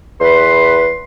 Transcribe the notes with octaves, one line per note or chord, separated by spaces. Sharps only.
E2 B4 C6